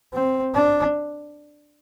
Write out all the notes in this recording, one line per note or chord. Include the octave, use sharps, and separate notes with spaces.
C4
D4